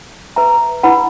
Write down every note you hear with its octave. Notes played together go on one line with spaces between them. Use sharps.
B4 E5 A#5
E4 B4 F#5 B5